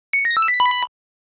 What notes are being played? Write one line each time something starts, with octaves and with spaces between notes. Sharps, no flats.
C#7
A#6
E6
B6
B5